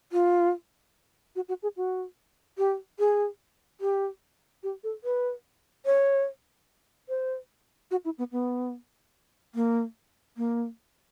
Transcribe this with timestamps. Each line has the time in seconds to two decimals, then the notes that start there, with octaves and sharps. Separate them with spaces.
0.12 F4
1.36 F#4
1.49 F#4
1.63 G#4
1.77 F#4
2.58 G4
2.99 G#4
3.81 G4
4.63 G4
4.84 A4
5.04 B4
5.86 C#5
7.09 C5
7.91 F#4
8.05 E4
8.18 B3
8.32 B3
9.55 A#3
10.37 A#3